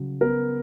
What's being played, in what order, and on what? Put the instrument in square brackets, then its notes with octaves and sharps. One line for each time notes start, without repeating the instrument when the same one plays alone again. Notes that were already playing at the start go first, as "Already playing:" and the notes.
Already playing: [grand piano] C#3 F#3
B3 A#4